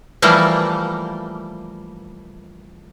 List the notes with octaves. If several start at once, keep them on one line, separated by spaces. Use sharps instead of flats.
E3 F3 G3 A3 A#3